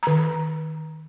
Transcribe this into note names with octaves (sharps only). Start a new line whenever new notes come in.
D#3 A#5